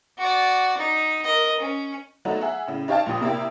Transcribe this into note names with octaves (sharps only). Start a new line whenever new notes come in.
F#4 D5
D#4
A#4 D#5
C#4
F#3 A3 B3 D#4
G#4 E5 F#5
A2 C#3
D#4 G4 C#5 F5 G5 A5
A#1 A#2 G4 D#6
C3 A#3 E4 G4